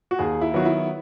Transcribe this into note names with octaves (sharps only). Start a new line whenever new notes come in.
F#4
D#2 G#4
E4
D#3 F#3 B3 F#4
E4